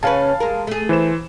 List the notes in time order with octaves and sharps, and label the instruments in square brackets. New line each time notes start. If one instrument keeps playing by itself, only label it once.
[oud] C#3 C#4 B4 [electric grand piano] F5 A5
[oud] G#3 A#4
A3 G#4
[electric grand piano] E3 C5 E7